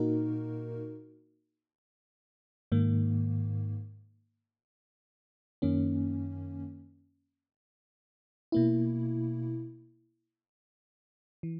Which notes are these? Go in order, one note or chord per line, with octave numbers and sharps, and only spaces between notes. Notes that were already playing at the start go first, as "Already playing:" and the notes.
Already playing: A#2 A#3 D#4 F#4 A#4
G#2 D#3 A#3
F#2 D#3 A#3 C#4
B2 A#3 E4
E3